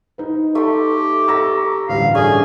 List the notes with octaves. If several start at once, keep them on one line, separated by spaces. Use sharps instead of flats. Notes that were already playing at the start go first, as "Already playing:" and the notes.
D#4 B4
A3 G4 C6
A4 A#5 C#6 E6 A#6
A1 D2 G2 F5
A3 C#4 D4 G#4